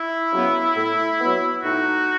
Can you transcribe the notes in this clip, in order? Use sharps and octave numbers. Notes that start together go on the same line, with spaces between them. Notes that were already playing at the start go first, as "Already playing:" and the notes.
Already playing: E4
C#3 F#3 B3
A2
F#3 B3
A2 D#4 F#4